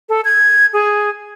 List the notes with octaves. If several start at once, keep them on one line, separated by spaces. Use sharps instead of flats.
A4
G#6
G#4